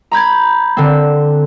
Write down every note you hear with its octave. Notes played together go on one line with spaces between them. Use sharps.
A#5 B5 G6 G#6
D3 C4